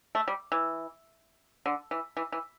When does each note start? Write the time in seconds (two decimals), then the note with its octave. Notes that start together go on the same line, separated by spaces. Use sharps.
0.15 A3
0.28 G3
0.52 E3
1.66 D3
1.91 E3
2.17 E3
2.32 E3